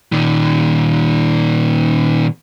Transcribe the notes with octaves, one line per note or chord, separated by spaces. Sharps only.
A#2 D#3